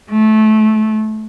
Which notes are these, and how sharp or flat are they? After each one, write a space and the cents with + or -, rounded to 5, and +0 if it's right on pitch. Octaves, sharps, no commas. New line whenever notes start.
A3 -20